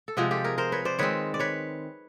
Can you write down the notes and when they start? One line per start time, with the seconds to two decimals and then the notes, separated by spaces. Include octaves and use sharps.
0.08 A4
0.17 C3 F3 G#3 F#4 G#4
0.31 G4 A4
0.44 G#4 A#4
0.58 A#4 C5
0.72 B4 C#5
0.85 C5 D5
0.99 D#3 G#3 C4 B4 C#5
1.34 D5
1.40 B4 C#5